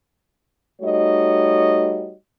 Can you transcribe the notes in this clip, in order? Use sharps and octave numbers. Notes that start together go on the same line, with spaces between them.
G3 A3 D#4 F#4 C#5 D#5